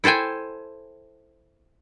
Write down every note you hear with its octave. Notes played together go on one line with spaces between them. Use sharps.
E4 A4 C5 G5 G#5